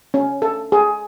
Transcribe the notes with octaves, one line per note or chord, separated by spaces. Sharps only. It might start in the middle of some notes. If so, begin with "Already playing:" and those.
C#4
A4
G#4